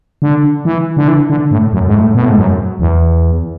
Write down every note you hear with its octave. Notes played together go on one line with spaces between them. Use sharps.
D3
E3
D3
E3
D3
A2
F#2
G#2
A2
B2
A2
G#2
F#2
E2